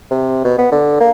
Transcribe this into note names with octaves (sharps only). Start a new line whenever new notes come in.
C3
B2
B3
D3
A#3